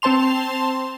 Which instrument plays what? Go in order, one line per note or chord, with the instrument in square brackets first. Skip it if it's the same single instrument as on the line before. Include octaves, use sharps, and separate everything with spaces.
[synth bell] C4 C5 A5 C6 F7